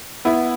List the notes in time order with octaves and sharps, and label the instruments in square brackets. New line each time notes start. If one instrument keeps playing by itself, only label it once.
[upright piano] B3 E4